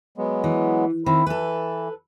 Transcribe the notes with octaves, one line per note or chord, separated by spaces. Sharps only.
F#3 G#3 B3
E3
D#3 C4 E4
E3 A4 B4